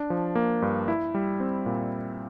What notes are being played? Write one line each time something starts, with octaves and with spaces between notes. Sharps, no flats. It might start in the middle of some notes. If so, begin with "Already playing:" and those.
Already playing: D4
F3
A#3
G2
E4
G3
C4
A#2